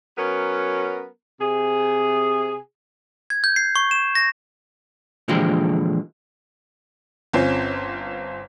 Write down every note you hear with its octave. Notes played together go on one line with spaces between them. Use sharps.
F#3 B3 C#4 A#4
C3 G#4
G#6
G6
C7
C#6
E7
A#6
A#2 D3 E3 F3 G#3 G4
G1 C4 C#4 F4